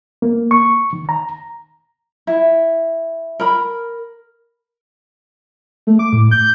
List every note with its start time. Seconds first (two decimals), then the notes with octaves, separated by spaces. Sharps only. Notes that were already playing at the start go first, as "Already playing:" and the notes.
0.22 A#3
0.51 C#6
0.93 D#3
1.09 A#5
2.27 E4
3.40 A#4 B5
5.87 A3
5.99 D6
6.13 A2
6.31 G6